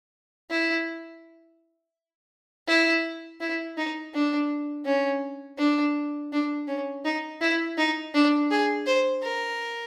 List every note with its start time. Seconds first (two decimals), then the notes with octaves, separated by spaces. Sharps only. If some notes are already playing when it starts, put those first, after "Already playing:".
0.50 E4
2.68 E4
3.41 E4
3.77 D#4
4.14 D4
4.86 C#4
5.59 D4
6.33 D4
6.68 C#4
7.05 D#4
7.41 E4
7.78 D#4
8.14 D4
8.51 G#4
8.86 C5
9.22 A#4